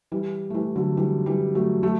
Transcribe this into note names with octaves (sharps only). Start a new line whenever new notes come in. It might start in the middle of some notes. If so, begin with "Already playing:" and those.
E3 G3
A3
E3 G3
D3 F#3
E3 G3
E3 G3
F#3 A3
F#3 A3